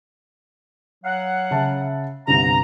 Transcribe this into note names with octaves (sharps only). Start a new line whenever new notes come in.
F#3 F5 F#5
C#3 E5 A5
G1 C2 A#5